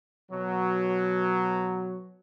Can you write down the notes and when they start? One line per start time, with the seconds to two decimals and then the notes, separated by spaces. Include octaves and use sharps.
0.31 B2 F#3